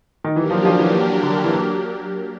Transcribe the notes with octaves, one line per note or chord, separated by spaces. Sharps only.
D#3
E3 F#3 A#3 D4 G4 A#4
F3
F3
E3
D3
E3